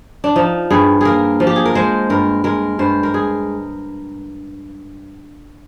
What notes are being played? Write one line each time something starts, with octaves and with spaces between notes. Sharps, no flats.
D4
F3 D#4
G2 G#4
A#3 G#4 A#4
F3
G4
G#4
A#4
G#3 C5
G2 A#4
G#3 A#4
G2 C5
A#4
G#4